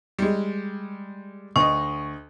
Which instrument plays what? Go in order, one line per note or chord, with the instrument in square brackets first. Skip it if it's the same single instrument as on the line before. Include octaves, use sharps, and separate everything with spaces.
[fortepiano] G3 G#3
[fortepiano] D2 D#5 [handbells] C#6